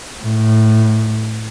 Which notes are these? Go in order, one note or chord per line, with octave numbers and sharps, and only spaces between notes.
A2